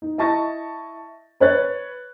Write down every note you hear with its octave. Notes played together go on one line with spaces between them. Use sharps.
D#4
E4 D#5 A5 C#6 A6 A#6
B4 C#5 F#6 A6